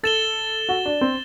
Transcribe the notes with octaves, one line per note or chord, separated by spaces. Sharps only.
A4 A6 E7 G7
F#4
D4
C4